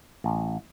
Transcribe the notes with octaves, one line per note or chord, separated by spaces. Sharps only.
A1